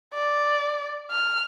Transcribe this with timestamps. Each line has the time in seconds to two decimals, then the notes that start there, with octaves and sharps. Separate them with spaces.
0.14 D5
1.11 F6